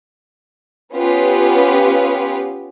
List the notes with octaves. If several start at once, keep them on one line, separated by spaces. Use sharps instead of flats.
B3 C#4 F4 G4 B4